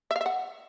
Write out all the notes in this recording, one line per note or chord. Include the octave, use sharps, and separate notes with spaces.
E5
F5
E5
F#5